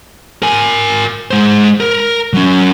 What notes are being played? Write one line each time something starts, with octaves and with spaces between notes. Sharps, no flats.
A#4 G#5
G#3 C5
A#4
F#3 C#4